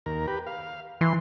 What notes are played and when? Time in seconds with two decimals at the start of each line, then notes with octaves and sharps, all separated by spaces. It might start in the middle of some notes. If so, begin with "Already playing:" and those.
0.06 D#2 A#4
0.27 G4 B4
0.47 F5
1.01 E3 C6